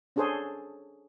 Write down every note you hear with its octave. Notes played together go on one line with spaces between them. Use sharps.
C#4 D4 G#4 A4 C5 C#5